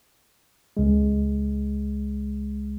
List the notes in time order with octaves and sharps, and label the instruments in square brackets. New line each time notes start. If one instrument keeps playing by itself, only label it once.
[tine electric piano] C#2 G#3